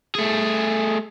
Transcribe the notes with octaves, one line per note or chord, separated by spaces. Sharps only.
A3 G#4